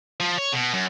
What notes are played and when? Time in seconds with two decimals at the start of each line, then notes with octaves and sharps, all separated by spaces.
0.20 F3
0.38 C#5
0.52 B2
0.73 F#2